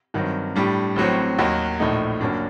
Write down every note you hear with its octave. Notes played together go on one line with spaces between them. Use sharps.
G2 D#3 F#3 C4
A2 G3 D4
A1 A2 F#3 C4
D#2 D#3 F#3
A#1 A2 A3 D#4
F#1 F#2 F#3 A#3 D4